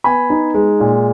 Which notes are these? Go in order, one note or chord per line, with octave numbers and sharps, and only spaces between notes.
B3 G#5 B5
D#4
G#3
A#2